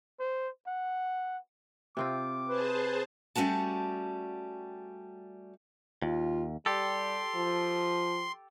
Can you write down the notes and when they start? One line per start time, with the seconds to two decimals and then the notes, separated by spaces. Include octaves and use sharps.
0.20 C5
0.68 F#5
1.97 C3 C4 F4 D6
2.49 G#4 B4 C5 A5
3.35 G3 A3 C#4 F#4 A5
6.02 D#2 F4
6.66 G3 G4 A4 C6
7.35 F3